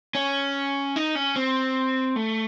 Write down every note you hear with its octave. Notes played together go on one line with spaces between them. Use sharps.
C#4
D#4
C#4
C4
A3